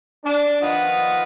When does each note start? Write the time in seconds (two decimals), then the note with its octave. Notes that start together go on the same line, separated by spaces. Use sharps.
0.25 D4
0.61 D#3 F3 F4 B4 D#5 F#5